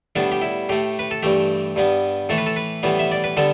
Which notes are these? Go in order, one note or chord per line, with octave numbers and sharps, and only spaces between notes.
A2 G3 B3 D4
G4
E4
A2 A3 G4
B4
A4
G2 E3 A3 G4
G2 G3 B3
A2 E3 A3 A4
B4
A4
B4
A2 E3 G3 B3
E5
D5
B4
D3 G3 B3 A4